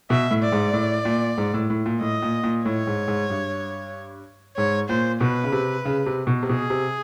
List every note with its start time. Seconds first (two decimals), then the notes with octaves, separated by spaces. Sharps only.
0.10 B2 E5
0.31 A2
0.42 D5
0.52 G#2
0.73 A2
1.05 A#2
1.38 G#2
1.54 A2
1.70 A2
1.86 A#2
2.01 A2 D#5
2.22 A#2
2.43 A#2
2.65 A2 C#5
2.87 G#2
3.08 G#2
3.30 G2
4.57 G#2 C#5
4.89 A#2 C5
5.20 B2 B4
5.44 C#3
5.52 C3
5.85 C#3
6.06 C3
6.27 B2
6.43 C3
6.49 B2 G#4
6.70 C3